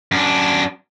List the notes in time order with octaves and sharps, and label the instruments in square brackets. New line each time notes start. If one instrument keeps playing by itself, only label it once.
[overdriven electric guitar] F#2 D4